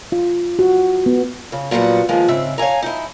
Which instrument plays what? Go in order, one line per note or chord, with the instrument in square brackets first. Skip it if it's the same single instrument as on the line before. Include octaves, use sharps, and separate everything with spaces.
[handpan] F4
F#4
B3
[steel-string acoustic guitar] C#3
A#2 F#3 G3 B3 F#5
D#3 F3 G#3 A#3
G#2 C#3 C4 E5
C#5 F5 G#5 A#5
D#4 E4